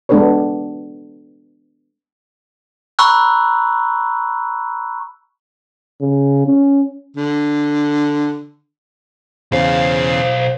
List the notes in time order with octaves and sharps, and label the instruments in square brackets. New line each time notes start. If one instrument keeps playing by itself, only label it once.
[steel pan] G#3 B3 D4 A4 B4 C#5
[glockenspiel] A#5 B5 C#6 E6 F#6
[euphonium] C#3
C#4
[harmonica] D3
[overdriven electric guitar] B1 F5 [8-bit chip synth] E2 C#3 [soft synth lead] C5